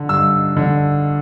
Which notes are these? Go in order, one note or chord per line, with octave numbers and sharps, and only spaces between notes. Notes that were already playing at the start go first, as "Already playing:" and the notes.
Already playing: D3
G2 E6
D3